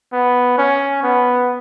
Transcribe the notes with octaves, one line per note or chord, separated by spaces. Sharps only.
B3
C#4
B3